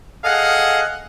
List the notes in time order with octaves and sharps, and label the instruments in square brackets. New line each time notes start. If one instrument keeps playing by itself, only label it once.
[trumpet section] G#4 A4 D#5 F5 F#5